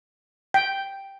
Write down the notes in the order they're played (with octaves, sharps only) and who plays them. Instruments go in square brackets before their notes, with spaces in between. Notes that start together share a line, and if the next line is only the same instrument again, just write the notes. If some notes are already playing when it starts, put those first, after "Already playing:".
[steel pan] G5